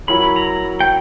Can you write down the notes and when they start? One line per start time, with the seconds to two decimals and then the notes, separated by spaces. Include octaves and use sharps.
0.08 F#3 C#4 E4 A#4 C#5 B5
0.36 A#5
0.80 G5